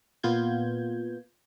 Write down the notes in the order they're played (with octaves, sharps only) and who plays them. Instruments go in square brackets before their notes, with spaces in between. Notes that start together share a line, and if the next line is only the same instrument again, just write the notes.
[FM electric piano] A#2 B3 F4 G6 G#6